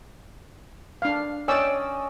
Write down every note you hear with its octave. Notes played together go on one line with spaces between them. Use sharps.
D4 F5
C#4 D5 D#5 G5 E6